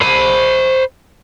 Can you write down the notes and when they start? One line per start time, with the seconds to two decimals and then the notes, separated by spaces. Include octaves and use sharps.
0.02 C5 B5